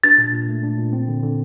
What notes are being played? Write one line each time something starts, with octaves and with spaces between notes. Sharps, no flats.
D4 A6
A#2
A#2
A3
D4
A#2
C4
D3
D3